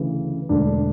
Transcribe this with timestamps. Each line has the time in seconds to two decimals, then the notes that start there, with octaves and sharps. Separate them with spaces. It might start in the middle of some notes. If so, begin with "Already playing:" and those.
Already playing: D2 C#3 E3
0.49 E1 D2 D3 D4